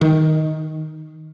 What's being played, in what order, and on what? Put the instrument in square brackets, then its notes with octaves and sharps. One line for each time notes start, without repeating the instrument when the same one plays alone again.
[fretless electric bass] D#3